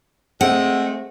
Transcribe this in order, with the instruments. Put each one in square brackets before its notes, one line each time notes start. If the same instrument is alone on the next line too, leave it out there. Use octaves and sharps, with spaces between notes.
[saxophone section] G#3 A3 C4 [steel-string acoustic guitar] F#5